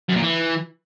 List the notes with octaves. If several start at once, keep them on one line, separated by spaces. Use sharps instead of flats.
F#2
A#2
E3